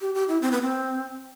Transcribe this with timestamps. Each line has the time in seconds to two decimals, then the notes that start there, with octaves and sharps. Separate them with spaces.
0.01 G4
0.15 G4
0.28 E4
0.42 C4
0.52 B3
0.62 C4